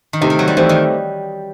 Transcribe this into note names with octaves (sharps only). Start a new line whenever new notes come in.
D#3
C3 A3 C4 D#4 G4 C5
D#3
F#3
G3
E3 A3 C4 D#4 G4 C5
D#3